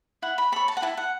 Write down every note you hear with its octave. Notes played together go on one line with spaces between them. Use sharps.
E4 F#5
B5
A4 C#5 B5
A5
F#5
E4 A5
F#5